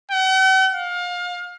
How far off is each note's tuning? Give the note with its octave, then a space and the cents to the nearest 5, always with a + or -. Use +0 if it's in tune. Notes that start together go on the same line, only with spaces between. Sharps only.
F#5 +45
F5 +30